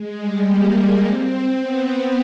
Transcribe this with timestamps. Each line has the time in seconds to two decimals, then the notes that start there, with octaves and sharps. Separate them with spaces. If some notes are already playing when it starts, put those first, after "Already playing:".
Already playing: G#3
0.19 G3
0.47 A#3
1.03 C4
1.60 B3